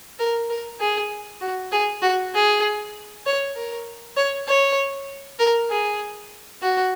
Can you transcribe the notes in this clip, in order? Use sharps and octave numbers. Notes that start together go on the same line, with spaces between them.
A#4
A#4
G#4
F#4
G#4
F#4
G#4
C#5
A#4
C#5
C#5
A#4
G#4
F#4